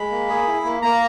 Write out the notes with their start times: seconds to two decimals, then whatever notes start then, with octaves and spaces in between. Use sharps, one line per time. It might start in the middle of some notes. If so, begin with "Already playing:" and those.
Already playing: G#3 B5
0.11 A#3
0.29 G#4
0.47 E4
0.65 A#3
0.82 A#3 A#5